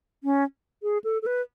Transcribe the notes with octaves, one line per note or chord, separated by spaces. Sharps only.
C#4
G#4
A4
A4
B4